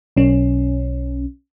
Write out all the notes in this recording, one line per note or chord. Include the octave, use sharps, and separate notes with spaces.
B1 C#4